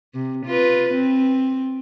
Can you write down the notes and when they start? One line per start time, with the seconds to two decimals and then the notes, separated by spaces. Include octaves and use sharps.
0.14 C3
0.46 F4 B4
0.94 C4